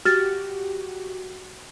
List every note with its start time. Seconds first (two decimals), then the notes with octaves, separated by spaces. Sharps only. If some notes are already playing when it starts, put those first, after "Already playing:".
0.05 F#4 G4 F6 A6